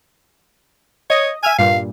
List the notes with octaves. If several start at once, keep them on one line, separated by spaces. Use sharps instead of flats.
C#5 D#5
E5 G#5 E6 F6
G2 A#2 F5